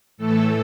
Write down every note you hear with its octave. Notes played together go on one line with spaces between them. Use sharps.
A2 E3 A3 A4